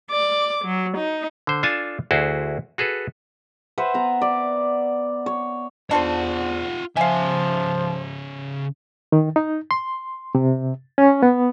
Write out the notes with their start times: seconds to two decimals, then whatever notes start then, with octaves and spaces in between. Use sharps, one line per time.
0.11 D5 D6
0.65 F#3
0.97 D#4
1.47 D3 C5
1.63 D4 F4 A4 G#5 A5
2.11 D2 E4 F#4 G#4 C5 A5
2.78 F#4 G#4 A4 B4
3.78 B4 C5 E5 F#5
3.94 B3 A#5
4.22 D5
5.26 C#5
5.91 E2 D4 F4 A4 C5 F#5
6.97 C#3 F3 E5 F5 G#5
9.12 D#3
9.36 D#4
9.71 C6
10.35 C3
10.98 C#4
11.23 B3